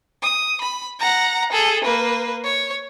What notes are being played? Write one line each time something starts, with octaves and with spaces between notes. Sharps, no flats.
D#6
B5
F#5 A#5
G#4 A4
A#3 B4
C#5